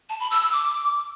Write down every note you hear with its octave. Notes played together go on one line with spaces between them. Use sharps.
A5
B5
E6
E6
D6